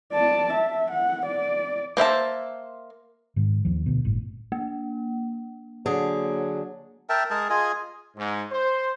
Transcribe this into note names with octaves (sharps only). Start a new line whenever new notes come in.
D5 A5
E5
F#5
D5
A#3 C5 E5 A5
G#2 D#3
D#2 F3
D2 B2
G1 A2
A#3
D3 F#3 G#4
A#4 E5 G5 A5
G#3 G#4 A#4 A5
F4 G#4 D#5 G#5
G#2
C5